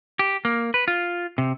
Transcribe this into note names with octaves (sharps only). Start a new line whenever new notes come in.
G4
A#3
B4
F4
C3